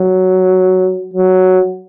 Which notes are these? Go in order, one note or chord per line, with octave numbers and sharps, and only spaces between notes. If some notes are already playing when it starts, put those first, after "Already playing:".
Already playing: F#3
F#3